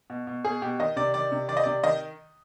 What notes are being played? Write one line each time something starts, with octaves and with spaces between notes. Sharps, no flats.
B2
B2
B2 G#4
B2 G4
D#3 D#5
C3 D5
D#3 D5
C3
D#3 D5
D#5
C3 D5
D#3 D#5